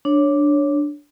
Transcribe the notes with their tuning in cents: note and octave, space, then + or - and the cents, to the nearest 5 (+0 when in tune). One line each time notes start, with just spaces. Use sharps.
D4 +0 C#5 +0